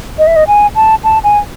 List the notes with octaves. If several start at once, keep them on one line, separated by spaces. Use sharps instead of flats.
D#5
E5
D#5
G#5
A5
A5
G#5